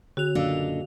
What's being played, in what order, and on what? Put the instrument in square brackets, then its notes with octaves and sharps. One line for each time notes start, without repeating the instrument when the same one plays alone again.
[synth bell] D3 F7 [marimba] F#4 F#6
[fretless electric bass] F#1 F#2 A#2 [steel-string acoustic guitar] D4 A4 D#5 [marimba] F5 E6